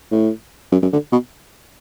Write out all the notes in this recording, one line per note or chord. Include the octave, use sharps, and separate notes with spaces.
A2
F#2
F#2
D3
B2